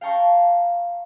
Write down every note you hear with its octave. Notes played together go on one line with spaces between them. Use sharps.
F5 G5 A5 A#5 C#6